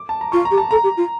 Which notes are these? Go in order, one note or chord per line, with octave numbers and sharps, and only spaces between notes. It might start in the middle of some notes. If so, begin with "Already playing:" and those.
Already playing: D6
A5
A#5
F4 C#6
A#5
G4
A5
A4 A#5
G4
F4